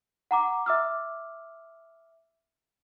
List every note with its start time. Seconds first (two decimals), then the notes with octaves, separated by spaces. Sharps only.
0.31 F#5 A#5 D6
0.66 E5 D6 E6 F6